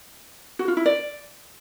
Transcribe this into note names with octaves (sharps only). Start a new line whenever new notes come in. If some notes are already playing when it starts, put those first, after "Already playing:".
F#4
F4
E4
D5